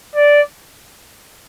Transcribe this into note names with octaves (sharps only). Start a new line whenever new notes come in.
D5